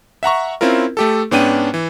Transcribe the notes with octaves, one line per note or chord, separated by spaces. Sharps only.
E5 F#5 A#5 C#6
C4 C#4 E4 F4 A#4
A3 G4 A4
G#2 B3 C#4 D4 G5 D#7
E3